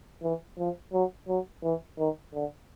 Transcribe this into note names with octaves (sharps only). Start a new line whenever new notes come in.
E3
F3
F#3
F#3
E3
D#3
D3